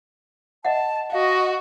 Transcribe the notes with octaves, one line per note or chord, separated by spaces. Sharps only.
D#5 E5 F#5 A5
F#4 D#5 F5